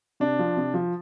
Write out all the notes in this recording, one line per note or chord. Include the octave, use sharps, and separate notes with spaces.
C3 D4
F3
C3
F3